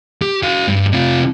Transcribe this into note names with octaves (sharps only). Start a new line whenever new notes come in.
G4
F#4 F5
G2
C3 F4